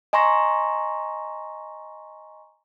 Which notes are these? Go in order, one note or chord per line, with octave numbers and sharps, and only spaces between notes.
D#5 G#5 A#5 C6 C#6 A#6